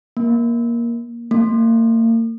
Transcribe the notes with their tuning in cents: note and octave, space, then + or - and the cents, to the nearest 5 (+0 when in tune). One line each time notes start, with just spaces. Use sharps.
A#3 +15
A#3 -35